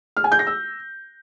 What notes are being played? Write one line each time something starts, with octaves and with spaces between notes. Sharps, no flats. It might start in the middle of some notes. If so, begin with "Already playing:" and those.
F6
G#5
G6
A#6
E6